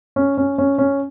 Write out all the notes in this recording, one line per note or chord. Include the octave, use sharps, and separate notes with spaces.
C#4
C#4
C#4
C#4